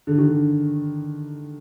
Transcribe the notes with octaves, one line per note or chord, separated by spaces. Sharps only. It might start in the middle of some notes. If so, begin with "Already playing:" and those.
D3
D#3
D3